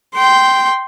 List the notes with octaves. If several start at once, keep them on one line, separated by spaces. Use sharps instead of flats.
G5 C6